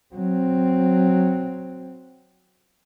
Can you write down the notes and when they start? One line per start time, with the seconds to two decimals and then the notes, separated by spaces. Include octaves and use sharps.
0.14 F#3 C4